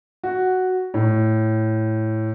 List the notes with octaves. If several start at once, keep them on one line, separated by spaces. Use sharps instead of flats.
F#4
A2